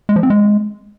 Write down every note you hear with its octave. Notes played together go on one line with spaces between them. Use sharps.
G#3
F3
C4
G#3